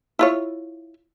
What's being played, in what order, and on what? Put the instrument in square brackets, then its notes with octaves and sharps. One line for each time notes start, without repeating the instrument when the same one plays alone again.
[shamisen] E4 F4 C#5